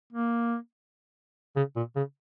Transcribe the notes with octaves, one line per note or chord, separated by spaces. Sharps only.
A#3
C#3
A#2
C#3